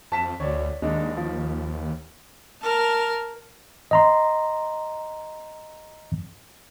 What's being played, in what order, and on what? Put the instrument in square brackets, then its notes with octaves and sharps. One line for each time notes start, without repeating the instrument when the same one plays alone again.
[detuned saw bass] F2 [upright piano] A5 B6 E7
[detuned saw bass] D2 [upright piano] C#5 D5
[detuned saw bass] D#2 [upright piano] G#3 D4 D#4
[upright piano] D#3 F3
[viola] A#4 A5
[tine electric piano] D#5 A#5 C6